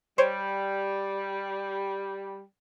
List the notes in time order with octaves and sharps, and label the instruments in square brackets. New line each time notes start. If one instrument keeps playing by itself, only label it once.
[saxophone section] G3 [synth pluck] C5 C#5